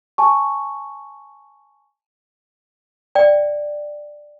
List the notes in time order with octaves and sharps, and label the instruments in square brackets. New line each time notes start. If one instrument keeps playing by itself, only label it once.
[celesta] G#5 A5 C#6
[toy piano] D5 G5